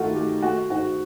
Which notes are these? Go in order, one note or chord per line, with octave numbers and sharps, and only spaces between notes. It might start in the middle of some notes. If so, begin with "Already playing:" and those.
Already playing: D#3 A3 F4 F#4
A3 G4
A3 F#4
G#2 F#4